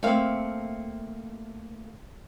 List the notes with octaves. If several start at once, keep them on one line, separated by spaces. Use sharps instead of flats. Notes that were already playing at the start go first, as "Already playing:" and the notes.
A3 A#3 C4 E5 F5